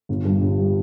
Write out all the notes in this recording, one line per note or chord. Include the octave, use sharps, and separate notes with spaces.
G1
G2 G3
G1
G3